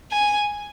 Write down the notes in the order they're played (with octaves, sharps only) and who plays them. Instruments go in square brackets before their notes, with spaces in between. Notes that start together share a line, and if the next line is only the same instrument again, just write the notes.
[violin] G#5